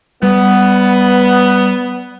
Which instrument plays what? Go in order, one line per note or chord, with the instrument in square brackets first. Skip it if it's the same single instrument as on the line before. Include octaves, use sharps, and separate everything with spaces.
[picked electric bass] G3 [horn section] B3